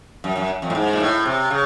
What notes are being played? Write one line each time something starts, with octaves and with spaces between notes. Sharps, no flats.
F#2
F#2
F2
A2
G#2
A#2
A2
C3
C#3